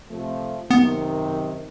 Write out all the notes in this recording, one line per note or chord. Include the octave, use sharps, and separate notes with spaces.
C3 F3 A3
F#2 C3 D#3 B3